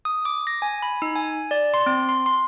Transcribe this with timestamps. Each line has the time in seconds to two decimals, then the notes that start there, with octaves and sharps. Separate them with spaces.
0.05 D#6
0.25 D6
0.47 A#6
0.62 G#5
0.82 B5
1.02 D#4
1.16 G#5
1.51 D5
1.74 C6
1.86 C4
2.09 C6
2.26 C6